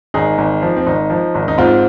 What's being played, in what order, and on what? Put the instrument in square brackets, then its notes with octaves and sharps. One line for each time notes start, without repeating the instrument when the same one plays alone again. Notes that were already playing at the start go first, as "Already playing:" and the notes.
[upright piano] G#1 D#4 G#4
G#1
F3
C4
G#1 D#4
F3
G#1
D#4
G#2 C4 F4